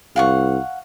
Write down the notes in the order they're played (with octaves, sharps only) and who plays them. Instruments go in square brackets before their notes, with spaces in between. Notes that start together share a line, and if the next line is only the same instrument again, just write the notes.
[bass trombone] C2 [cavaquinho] F5 F#5 C#6